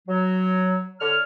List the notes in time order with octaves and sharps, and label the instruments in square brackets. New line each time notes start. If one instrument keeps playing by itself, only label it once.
[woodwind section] F#3
D3 C#5 F6